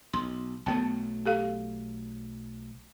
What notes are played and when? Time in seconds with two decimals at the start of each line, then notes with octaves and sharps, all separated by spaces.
0.13 B1 C6
0.66 B1 F#3 A3 B3 G5 A5
1.26 G4 A4 F5